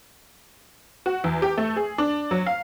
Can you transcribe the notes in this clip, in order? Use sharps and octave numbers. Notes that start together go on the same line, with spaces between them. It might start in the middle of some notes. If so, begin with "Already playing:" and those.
F#4
E2
G4
A3
G#4
D4
F#3
F5